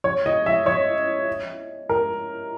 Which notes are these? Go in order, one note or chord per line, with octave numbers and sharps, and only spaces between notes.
C#5
D#5
E5
C#5
A#4